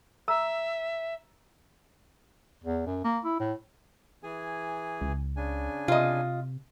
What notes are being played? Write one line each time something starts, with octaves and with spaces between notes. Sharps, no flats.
E5 A#5 E6
E2
F#2
A#3
E4
A2
E3 G#4 G#5
C#2
C#3 D4 G#5
C3 F4 D#5